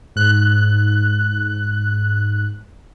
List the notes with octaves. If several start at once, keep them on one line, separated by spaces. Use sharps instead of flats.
G#2 F#6